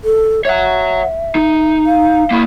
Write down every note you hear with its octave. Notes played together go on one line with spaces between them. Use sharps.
A4
C#5 E5 F#5
D#4
F5
A#3 E4